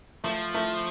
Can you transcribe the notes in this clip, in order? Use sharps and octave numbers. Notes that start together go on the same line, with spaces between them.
F3 A3
A3